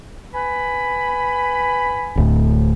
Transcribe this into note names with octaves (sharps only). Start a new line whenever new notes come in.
B4 G#5 B5
D1 D2 A2